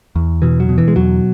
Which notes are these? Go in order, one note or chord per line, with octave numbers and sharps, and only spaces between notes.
E2
B2 E3
F#3
B2
E3
G#3
E2 F#3